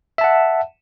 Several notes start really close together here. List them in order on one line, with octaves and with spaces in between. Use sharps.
E5 A5 F#5